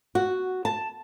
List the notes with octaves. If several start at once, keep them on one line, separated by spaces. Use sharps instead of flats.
F#4
A5